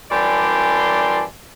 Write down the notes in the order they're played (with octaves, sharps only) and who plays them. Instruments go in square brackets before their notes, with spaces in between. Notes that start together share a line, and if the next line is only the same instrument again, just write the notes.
[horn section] F#2 E3 G3 D5 A5 C6